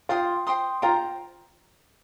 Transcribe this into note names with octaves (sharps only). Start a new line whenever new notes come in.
F4 C5 G5 C6 D#6
C5 G5 C6 D#6
F4 C5 G5 A#5